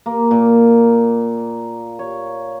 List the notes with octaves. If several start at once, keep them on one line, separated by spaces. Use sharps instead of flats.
A#3
A#2
C#5